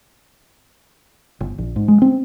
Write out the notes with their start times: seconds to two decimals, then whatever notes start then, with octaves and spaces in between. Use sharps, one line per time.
1.40 G1
1.58 A#1
1.76 G#2
1.88 G#3
2.02 C4